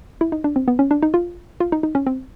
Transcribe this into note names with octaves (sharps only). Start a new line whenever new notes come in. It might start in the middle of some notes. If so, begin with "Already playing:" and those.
E4
D#4
D4
C4
B3
C#4
D4
D#4
F4
F4
D#4
D#4
C#4
C4